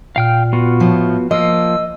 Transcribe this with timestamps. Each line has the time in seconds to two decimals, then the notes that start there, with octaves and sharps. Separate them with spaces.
0.16 A#2 F5 G5 F6
0.53 B3 F4 F#4
0.80 A2 F3
1.31 F3 A#3 F4 D#5 E6